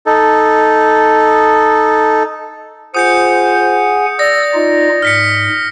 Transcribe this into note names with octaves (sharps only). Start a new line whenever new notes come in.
D#4 A4
F4 G#4 C5 F#5 G#5 D#6 G6 C#7
D5 D#6 E6 A#6
D#4 F4 D#5
G#2 F6 B6 C#7